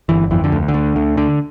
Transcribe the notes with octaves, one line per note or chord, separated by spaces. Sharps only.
G1 E3
F2 E3
D3
D2
D3
D2
D2
D3